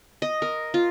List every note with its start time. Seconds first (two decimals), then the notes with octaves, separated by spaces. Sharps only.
0.22 D#5
0.42 A#4
0.74 F4